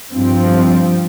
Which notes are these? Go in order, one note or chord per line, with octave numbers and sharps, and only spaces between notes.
G2 F3 C4